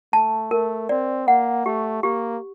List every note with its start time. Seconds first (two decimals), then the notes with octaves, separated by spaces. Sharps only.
0.13 A3 A5
0.51 A3 A#4
0.89 C4 D5
1.27 A#3 F#5
1.65 A3 G4
2.03 A#3 G4